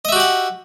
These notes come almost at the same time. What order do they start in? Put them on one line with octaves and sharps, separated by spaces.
D#5 E5 F#4 G4 F#5